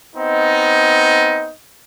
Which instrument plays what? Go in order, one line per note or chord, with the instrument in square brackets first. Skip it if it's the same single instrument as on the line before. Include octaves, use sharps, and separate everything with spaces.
[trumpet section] B3 C4 D#4 D#5